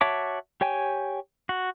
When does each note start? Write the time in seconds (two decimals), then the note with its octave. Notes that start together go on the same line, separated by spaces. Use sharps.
0.01 F#4 C#5 E5 A5 D6
0.61 G4 C#5 G5 G#5
1.49 F#4